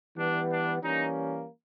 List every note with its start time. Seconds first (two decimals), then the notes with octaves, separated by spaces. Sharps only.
0.15 E3 G3 B3 D4
0.48 D4
0.81 E3 G3 A#3 C#4 D#4